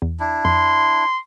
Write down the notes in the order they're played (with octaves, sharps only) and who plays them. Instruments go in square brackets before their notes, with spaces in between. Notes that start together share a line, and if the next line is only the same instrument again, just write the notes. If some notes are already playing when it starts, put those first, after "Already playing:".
[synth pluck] E2
[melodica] D4 E4
[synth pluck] F2 [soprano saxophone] C6